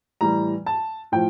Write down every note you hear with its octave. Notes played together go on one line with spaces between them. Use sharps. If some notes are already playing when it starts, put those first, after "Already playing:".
A2 E3 G3 A#5
A5
A2 F3 G5